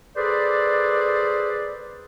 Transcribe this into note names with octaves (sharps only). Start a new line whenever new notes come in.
G#4 A4 B4 C5 D5